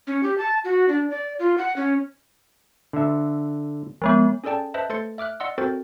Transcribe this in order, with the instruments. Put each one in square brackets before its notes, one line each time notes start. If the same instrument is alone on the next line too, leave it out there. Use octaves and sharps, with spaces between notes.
[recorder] C#4
G4
A5
F#4
D4
D5
F4
F#5
C#4
[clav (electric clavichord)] D3 E5
[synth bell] F3 G#3 B3
[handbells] C#4 G#4 A4 D5 G5 A5
B4 C5 D#5 E5 A5
A3 A4 C5 C6 A6 C#7
E5 D6 F6 F#6
D5 D#5 F#5 C6 E6
C4 F#4 A4 A#4 C5 A6